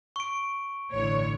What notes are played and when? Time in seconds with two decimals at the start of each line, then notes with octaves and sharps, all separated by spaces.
0.16 C#6 D7
0.92 A1 D3 C#5